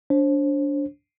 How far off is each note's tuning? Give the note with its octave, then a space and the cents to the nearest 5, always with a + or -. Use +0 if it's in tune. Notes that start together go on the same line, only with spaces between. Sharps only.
D4 -25 C5 +30